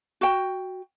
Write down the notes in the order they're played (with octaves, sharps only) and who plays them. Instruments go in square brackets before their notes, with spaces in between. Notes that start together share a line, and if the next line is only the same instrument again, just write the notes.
[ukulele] F#4 G5